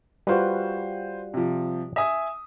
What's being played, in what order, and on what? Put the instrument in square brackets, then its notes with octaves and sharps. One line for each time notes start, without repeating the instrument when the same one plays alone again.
[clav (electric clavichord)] G3 F4 F#4 [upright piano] B4 C5
[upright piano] C3 F3
E5 G#5 D#6